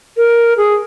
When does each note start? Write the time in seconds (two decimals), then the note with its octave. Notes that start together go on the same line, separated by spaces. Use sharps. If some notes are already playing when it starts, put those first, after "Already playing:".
0.17 A#4
0.57 G#4